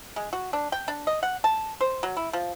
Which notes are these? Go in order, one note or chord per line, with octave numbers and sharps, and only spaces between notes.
G#3
F#4
D4
G5
D4
D#5
F#5
A5
C5
F#3
E4
F3